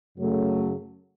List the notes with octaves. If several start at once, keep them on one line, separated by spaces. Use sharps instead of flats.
F#2 C#3 F#3 A3